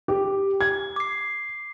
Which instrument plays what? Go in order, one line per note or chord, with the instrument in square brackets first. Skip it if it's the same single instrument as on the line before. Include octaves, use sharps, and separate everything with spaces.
[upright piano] G4
G#6
[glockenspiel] D6 C7